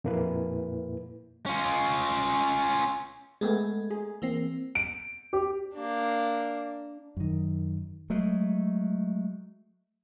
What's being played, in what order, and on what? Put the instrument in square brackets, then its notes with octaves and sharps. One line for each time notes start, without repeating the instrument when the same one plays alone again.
[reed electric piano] F2 A#2 A#3 E4 B4
[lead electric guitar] C#4 F4
[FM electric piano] G#3 [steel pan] A3 B3 G#4
[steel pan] G#4
[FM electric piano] E3 A#3 C4
[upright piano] D7
G4
[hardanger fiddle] A#3 D4
[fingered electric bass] F#2 D#3
[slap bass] F#3 G#3 A3